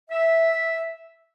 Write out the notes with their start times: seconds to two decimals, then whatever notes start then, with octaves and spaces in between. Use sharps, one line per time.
0.11 E5